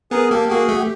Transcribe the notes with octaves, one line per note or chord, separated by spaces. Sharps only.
B3 G#4 A#4
A#3 G4 A4
A#3 F#4 G#4
A3
G4